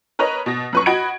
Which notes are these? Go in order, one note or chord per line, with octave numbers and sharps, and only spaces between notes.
A#4 B4 C#5 D#5
B2 A#6
F#2 B4 C#6
F#4 D#5 F#5 B5 G#6 D7